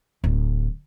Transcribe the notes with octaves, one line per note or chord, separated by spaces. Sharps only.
D1 D4